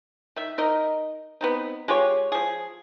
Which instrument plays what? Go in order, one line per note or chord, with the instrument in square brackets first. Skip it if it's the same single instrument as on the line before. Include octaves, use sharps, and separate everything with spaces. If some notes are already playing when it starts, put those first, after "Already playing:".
[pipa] D#3 E5
D#4 A#4 D#5
B3 C4 D#4
G#3 F4 G4 C#5
F3 G#4